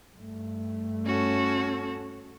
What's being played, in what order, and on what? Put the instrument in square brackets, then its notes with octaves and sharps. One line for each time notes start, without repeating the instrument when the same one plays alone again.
[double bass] G2 A3
[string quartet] C#4 F#4 A4